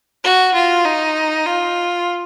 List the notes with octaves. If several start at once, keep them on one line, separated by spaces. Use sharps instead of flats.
F#4
F4
D#4
F4